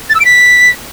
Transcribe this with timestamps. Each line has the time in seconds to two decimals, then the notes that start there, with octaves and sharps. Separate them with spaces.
0.09 A6
0.15 E6
0.20 D7
0.25 B6